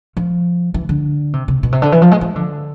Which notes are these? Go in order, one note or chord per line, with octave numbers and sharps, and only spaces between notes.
F3
E3
D3
C3
C3
B2
C3
D3
E3
F3
G#3
F3
D3